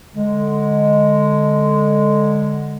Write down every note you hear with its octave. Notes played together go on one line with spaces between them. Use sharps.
D3 G#3